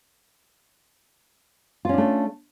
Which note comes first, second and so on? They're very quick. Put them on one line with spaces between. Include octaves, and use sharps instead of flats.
F4 C#4 D4 A3